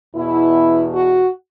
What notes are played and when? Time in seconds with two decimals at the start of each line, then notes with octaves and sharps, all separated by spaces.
0.16 E2 B2 E4
0.93 F#4